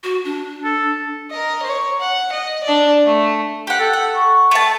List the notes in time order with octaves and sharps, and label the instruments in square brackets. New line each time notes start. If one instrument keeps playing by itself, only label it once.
[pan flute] F#4
D4
[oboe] A4
[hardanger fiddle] A#4 D#5
C#5
F#5
D#5
D4 D5
A3
[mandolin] G4 F#5
[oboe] A4
[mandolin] F#5
[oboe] C#6
[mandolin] A3 A5